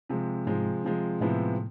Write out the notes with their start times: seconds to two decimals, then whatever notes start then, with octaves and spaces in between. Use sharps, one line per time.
0.09 C3 F3 G#3
0.47 G#2 C3 F3 G#3
0.84 C3 F3 G#3
1.21 A2 C3 F3 G#3 B3 E4